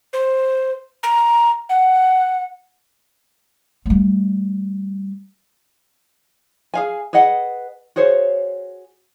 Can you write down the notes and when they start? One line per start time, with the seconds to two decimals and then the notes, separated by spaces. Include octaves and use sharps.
0.13 C5
1.03 A#5
1.69 F#5
3.86 G3 A3
6.74 G#4 F5 G#5
7.13 G#4 B4 D#5 F#5
7.96 F#4 G#4 C5 C#5